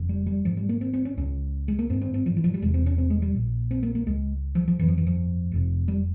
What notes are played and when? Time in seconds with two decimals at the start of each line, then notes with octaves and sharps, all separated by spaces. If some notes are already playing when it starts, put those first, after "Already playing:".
Already playing: F1 F2 C#3
0.09 G3
0.26 G3
0.45 G#1 G#2 F3
0.57 G3
0.69 A#3
0.81 C4
0.93 C4
1.05 C#4
1.17 C#2 C#3 C#4
1.68 G#3
1.79 A#3
1.90 G2 C4
1.93 G#1
2.02 C4
2.14 C4
2.26 F3
2.37 E3
2.44 F3
2.54 G3
2.62 E1 E2 C3 G#3
2.74 C4
2.86 C#4
2.98 C4
3.10 G#3
3.22 G3
3.34 A#1 A#2
3.71 C4
3.83 A#3
3.95 A#3
4.07 C#2 C#3 G#3
4.55 F3
4.68 F3
4.79 G1 F2 C#3 E3
4.88 F3
4.98 E3
5.07 F3
5.52 F1 F2 C3
5.88 G3